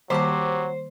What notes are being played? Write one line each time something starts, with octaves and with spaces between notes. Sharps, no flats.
D#3 F#3 G3 A#3 G4 C5 A5 B5